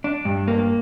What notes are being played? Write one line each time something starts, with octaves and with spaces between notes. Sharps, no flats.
D4
G2
A#3